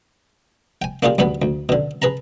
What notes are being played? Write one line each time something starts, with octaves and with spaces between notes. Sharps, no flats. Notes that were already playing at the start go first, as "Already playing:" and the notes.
G5 G#5
A#3 D4 F4 G4 G#4
D2 G2 B3 B4 G#5
D2
B2 D3
G#4 B4 A5 A#5